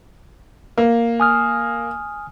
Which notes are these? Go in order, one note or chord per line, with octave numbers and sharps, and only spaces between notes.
A#3
G#5 D#6 F6